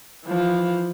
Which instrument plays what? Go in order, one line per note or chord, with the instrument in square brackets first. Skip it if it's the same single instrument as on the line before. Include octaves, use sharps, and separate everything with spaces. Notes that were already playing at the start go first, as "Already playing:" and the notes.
[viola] E3 F3